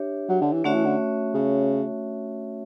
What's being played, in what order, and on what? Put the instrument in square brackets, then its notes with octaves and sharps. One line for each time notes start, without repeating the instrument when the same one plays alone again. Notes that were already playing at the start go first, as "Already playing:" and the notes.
Already playing: [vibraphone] D4 G4 C#5 E5
[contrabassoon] F#3
D3
E3
[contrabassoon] D3 [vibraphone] A3 C#4 F#4 C#5 E5
[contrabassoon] E3
D3
C#3